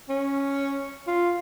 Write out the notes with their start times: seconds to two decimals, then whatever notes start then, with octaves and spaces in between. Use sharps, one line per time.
0.09 C#4
1.07 F4